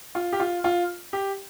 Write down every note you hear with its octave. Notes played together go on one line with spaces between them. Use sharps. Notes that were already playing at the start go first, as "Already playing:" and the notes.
F4
G4
F4
F4
G4